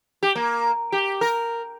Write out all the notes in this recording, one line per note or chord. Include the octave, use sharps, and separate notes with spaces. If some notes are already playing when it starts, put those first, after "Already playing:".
G4
A#3
G4
A#4